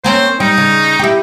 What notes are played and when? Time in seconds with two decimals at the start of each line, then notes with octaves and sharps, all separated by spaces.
0.04 A#3 C4 C#4 C5
0.40 G3 D#4
0.58 C#3
0.99 E4 G4